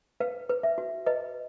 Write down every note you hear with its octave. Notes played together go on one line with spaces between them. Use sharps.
B4 F5
B4
E5
F#4
B4 D#5